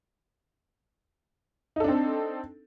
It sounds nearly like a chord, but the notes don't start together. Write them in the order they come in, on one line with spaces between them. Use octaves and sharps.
D#4 A4 D4 C4